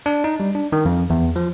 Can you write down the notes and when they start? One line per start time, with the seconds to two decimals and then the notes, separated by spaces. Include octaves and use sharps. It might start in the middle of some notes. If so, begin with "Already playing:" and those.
0.06 D4
0.24 D#4
0.40 G3
0.55 D4
0.72 D#3
0.85 F2
1.10 E2
1.36 F3